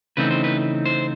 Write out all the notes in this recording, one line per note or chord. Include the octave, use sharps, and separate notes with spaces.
C#3 E3 A3 C4 D#4 B4
C5
B4
C5